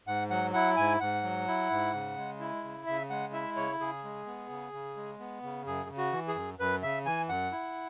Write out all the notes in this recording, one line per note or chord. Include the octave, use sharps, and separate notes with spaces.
G#2 F#5
F#3 F#5
E4 F#5
G#2 G#5
G#2 F#5
F#3
E4
G#2
C#3
G#3
E4
C#3
C#3 E5
G#3 F#5
E4 E5
C#3 C#5
C#3 G#4
G#3
B3
C#3
C#3
G#3
B3
C#3
F#2 G#4
C#3
F#4
E3
G#4
F#2
F#2 B4
C#3 E5
E3 G#5
F#2 F#5
E4